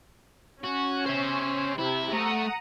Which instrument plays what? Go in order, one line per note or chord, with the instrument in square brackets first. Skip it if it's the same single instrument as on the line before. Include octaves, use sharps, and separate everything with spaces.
[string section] C#4 [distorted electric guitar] F#4
[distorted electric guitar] C5 E5
[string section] C3 [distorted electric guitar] E4
[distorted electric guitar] A3 [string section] F#5 A#5 D#6